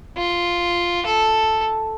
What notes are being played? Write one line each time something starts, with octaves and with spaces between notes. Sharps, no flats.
F4
A4